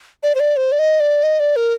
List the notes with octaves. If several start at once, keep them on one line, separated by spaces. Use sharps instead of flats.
D5
C5
D5
C5
D5
D#5
D5
D#5
D5
A#4